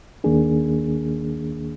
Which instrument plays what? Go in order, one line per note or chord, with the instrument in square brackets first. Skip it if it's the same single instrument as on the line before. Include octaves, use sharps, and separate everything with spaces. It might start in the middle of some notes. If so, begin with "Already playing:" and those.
[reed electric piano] D#2 D#3 A#3 D4 G#4